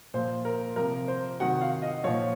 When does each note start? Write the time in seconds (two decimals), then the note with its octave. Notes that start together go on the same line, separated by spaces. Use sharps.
0.14 A#2 F3 C5
0.45 A#4
0.76 C3 F3 A#4
1.08 C5
1.40 C3 D#3 F#3 F#5
1.61 F5
1.82 D#5
2.04 A#2 F3 C#5